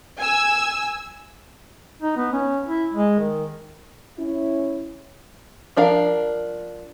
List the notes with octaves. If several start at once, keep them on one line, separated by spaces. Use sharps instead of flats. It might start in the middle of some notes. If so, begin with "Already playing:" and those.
G#5 E6
D#4
B3
C#4
E4
G#3
D#3
C#4 E4
F3 D4 A#4 F5